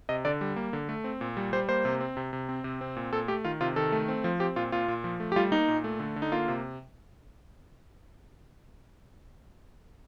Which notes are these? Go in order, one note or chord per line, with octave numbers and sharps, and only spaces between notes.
C3 D#5
D3 D5
G3
A#3
D3
A3
C4
A#2
G3
G3 C5
A#3 C5
C3
C4
C3
C3
C4
C3
C4
A#2
A#2 A4
A3 G4
D#3 F4
C3 F4
D#3 A4
A3
C4
F3
C4 G4
A#2 F4
A#2 F4
A#2
F3
A3
G4
G3 F4
A#3 D#4
A#2
A3
D3
D3
D#4
A#3 F4
C3